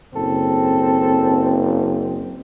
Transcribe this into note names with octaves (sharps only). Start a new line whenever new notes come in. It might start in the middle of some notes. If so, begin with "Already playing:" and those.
F#1 C4 A4